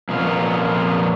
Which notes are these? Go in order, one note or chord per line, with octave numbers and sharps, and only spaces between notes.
F2 A#2 B3 C#4 F4